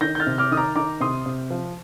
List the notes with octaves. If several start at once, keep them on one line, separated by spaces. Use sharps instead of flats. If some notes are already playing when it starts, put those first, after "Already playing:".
D#3 G6 A#6
G6
F6 A6
C3
D6 F6
D#3 D#6
A#5 D6
D#3 A#5 D6
C3 C6 D#6
C3
F3